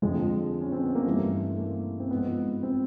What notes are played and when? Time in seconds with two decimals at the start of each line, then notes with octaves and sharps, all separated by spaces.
0.02 F2 D3 F3 G#3
0.62 C#4
0.72 C4
0.84 B3
0.95 A#3
1.06 G2 E3 A3
1.59 A#3
2.00 C4
2.11 G#2 F3 B3
2.63 C4